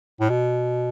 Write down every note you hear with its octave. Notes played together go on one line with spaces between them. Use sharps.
A2
B2